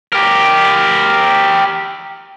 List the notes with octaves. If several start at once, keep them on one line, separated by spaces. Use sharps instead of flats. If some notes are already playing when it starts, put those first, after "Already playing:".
G4 A#4